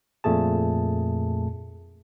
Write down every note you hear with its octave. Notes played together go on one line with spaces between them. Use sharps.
F2 A#2 A3 G#4 A5